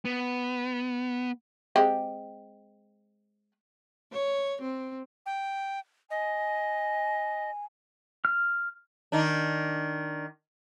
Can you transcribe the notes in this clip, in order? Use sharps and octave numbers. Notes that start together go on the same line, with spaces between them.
B3
G#3 C4 G4
C#5
C4
G5
D#5 G#5
F6
D#3 D4